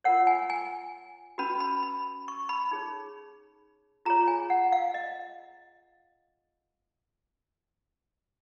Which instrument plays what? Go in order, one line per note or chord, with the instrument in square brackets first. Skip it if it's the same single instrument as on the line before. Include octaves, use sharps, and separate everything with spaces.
[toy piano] F4 A#4 C#5 F#5
G#5
G#5
C#4 F#4 B4 B5
B5
B5
C#6
B5
D#4 G#4 C#5
F4 G#4 C#5 A#5
G#5
F#5
F5
D#5